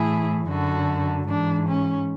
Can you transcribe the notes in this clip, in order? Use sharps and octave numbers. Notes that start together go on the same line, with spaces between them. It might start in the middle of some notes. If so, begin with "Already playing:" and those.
Already playing: A2 E3 E4 G#4
F#2 D3 F#4 A4
G#2 E3 D4
C#4